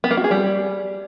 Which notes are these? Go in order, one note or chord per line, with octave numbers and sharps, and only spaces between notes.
B3
A#3
F#4
G#4
G3